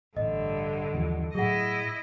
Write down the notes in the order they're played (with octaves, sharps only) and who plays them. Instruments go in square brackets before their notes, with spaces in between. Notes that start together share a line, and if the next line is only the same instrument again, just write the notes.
[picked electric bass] A1 [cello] G2 D3 [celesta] D#5
[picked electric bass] D#2 E3 F3
[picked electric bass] A2 F#3 [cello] E4 D#5 [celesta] G#4 F#5